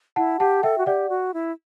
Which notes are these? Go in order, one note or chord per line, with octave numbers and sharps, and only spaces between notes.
E4 F#5 A5
G4 F#5 A5
A4 E5 G5
F#4
G4 D5 F#5
F#4
E4